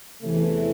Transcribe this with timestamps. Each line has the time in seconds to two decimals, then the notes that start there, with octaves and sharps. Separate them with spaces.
0.23 E2 C3 E3 A3